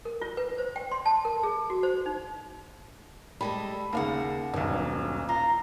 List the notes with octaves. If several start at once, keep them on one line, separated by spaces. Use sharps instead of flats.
A#4
F4
B4
C5
G5
C6
A5
A#4
G#4
F#4
C5
D#4
G3 G#3 A4 B5
D#2 C#3 A#3 F5 F#5
D#1 B1 G2 F#3
F4 A#5